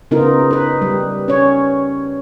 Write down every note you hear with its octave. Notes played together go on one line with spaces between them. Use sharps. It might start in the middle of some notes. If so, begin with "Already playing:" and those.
C#3 B3 D#4 F4 A#4
D#4 B4
G3
C#4 C#5